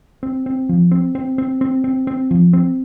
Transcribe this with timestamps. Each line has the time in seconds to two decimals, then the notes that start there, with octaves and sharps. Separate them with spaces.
0.23 C4
0.46 C4
0.69 F3
0.91 C4
1.15 C4
1.38 C4
1.61 C4
1.84 C4
2.07 C4
2.31 F3
2.53 C4